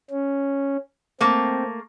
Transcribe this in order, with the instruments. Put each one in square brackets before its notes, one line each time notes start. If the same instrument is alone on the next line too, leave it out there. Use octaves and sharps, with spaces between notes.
[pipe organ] C#4
[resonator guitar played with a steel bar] A3 A#3 [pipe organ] C4